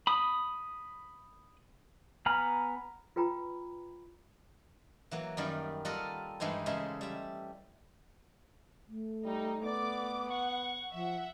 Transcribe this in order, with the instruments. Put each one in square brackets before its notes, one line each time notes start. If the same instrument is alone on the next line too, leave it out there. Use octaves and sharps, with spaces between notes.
[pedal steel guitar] B5 D#6
B3 G#5 A#5 B5 F6
[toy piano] F4 B4 G5 A#5 B5
[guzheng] E3 F#3 A#3
F#2 D#3 G3
G3 F4 A4 A#4 D#5 F#5
G2 E3 G#3 D#4 C5
C#3 G#3 A3 C5 E5
G3 E5
[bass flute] A3
[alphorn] G3 [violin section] D#4
[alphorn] B3 [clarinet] D5 [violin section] D6
[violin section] F#5 [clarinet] C#6
[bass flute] F3 [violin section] E5 F#5